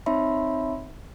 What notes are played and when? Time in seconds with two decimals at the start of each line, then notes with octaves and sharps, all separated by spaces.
0.06 C4 D#4 C#5 E5 B5 C6